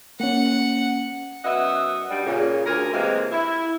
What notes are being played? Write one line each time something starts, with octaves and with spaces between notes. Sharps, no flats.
A#3 C#4 F#5
F#2 B3 D#5 E5 F#5
G2 G3
A#2 C#3
D2 G#4 A#4
C3 E3 G#3 A#3
E4